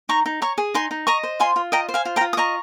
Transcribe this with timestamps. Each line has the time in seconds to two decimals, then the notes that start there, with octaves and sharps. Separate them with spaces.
0.09 D#4 A#5 C#6
0.26 D#4
0.42 C#5 A#5 C#6
0.58 G#4
0.74 D#4 G#5 C6
0.91 D#4
1.07 D#5 A#5 C#6
1.23 C5
1.40 F4 G#5 C6
1.56 F4
1.72 D#5 G5 A#5
1.89 C5
1.94 F5 G#5
2.05 F4
2.16 G5 A#5
2.21 F4
2.33 D#6
2.37 D#5 A#5 C#6